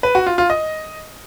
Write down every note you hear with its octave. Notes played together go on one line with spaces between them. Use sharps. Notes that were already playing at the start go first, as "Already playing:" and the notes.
B4
F#4
F4
F4
D#5